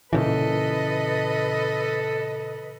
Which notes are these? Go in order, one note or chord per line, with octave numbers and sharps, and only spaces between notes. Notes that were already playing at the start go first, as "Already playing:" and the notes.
A#2 C#3 E3 A4 B4 D#5